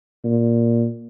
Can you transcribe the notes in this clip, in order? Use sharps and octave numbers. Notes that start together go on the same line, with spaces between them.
A#2